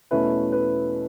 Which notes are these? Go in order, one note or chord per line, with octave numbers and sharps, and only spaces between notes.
E2 B2 A3 C#4 E4 B4
B4